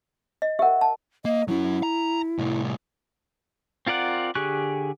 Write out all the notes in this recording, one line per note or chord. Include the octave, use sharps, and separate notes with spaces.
D#5
G4 A#4 E5 F#5
A5
A#3 D#5
F#3 C#4 E4
A#5
C2 A2
C4 F4 A#4 D5 F#5
D3 G4 G#4 C#6 F#6